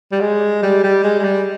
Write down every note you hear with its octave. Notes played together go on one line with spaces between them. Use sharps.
G3
G#3
G3
G3
G#3
G#3
G3